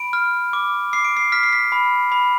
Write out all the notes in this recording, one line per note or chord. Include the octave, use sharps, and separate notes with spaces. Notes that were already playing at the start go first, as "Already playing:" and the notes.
Already playing: B5 D7
F6
D6
D6 C7
D7
C7
F6 B6
C7
B6
B5
B5